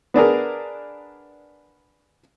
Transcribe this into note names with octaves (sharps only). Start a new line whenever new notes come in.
B3 D4 G#4 A#4